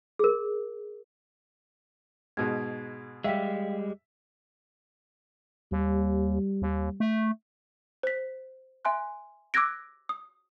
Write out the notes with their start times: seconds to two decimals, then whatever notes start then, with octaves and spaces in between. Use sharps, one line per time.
0.19 G#4 A#4
2.37 G#2 B2 G#3 G#6
3.24 G3 G#3 E5 F5 G5 B6
5.72 D#2 G3
6.62 D#2
7.00 A3
8.03 C5 B6
8.85 E5 G#5 C6 F#6
9.54 D6 E6 F#6 G#6 A#6 D7
10.09 D#6